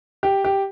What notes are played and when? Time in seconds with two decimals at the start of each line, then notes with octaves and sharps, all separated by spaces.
0.23 G4
0.45 G4